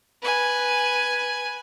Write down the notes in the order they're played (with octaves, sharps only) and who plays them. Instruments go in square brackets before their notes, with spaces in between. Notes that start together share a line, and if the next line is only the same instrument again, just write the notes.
[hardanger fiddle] B4 G#5